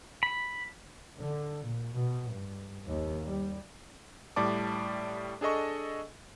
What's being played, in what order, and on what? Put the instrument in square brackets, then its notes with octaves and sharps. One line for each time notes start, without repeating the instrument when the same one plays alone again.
[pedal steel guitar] B5
[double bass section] D3
A#2
B2
G2
D#2
G3
[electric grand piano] A2 G3 D5 A5 D6
D4 G#4 A4 D#5 C#6